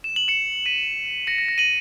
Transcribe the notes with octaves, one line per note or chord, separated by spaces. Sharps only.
E7
F#7
C#7 E7
B6 D#7
A#6 C#7
A#6
A#6
D#7 F#7